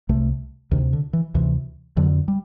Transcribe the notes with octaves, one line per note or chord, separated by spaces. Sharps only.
C2 C3 A3
D2 C3 D#3
D3
E3
D2 C3 E3
F2 D3 F#3
G3